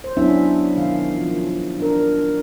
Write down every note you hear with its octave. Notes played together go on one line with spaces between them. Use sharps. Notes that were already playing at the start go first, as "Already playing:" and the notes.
C5
F#3 B3 C#4 D4 E4 E5
B2 D#3 F5
F3
D4 A#4